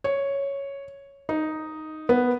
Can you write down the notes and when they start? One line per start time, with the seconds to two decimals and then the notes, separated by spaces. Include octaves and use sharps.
0.04 C#5
1.29 D#4
2.09 B3